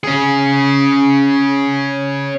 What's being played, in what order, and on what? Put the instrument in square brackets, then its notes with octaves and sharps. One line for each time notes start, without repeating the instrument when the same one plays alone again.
[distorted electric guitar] C#4 G#4